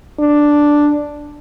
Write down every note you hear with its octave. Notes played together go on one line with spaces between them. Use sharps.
D4